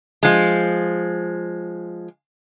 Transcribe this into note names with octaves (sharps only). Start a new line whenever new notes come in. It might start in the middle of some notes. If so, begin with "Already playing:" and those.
F3 G#3